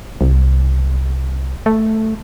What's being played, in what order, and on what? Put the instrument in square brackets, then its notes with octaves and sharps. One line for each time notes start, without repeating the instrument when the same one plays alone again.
[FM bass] C2
A3